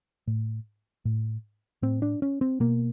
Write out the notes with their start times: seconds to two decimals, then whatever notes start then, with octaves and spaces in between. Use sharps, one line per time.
0.27 A2
1.05 A2
1.82 A2 C4
2.02 D4
2.22 C#4
2.41 C4
2.60 B2 A#3